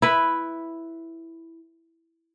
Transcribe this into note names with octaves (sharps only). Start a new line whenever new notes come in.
E4 B4